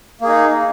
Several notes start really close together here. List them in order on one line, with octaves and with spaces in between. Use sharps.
A#3 G#4 D#4